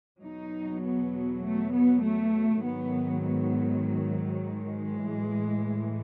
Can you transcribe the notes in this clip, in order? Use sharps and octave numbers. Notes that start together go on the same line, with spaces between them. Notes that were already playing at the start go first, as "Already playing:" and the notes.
E2 B2 F#3 D#4
B3
A3
B3
A3
G#2 D#3 F#3 B3
B3
G#3
A2 E3